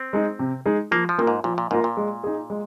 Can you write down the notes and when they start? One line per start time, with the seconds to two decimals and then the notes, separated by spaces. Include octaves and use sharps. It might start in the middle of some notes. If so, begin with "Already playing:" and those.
Already playing: C4
0.13 G#3 D#4 G#4
0.39 C3
0.66 G#3 D#4 G#4
0.91 F3 A#3
1.09 F3
1.18 A#2 A#3 F4 A#4
1.27 G#2
1.44 A#2 F3
1.58 A#2
1.71 G#2 A#3 F4 A#4
1.84 A#2
1.97 G#3
2.24 D#4 G#4
2.50 G#3